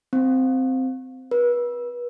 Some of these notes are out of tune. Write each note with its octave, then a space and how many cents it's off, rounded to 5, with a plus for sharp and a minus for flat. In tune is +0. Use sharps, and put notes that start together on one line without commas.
C4 -10
B4 -35